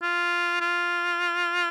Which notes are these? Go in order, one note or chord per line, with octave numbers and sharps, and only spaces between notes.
F4
F4